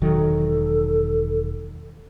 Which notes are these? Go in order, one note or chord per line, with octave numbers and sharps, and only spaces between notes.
E1 D#3 F#3 A4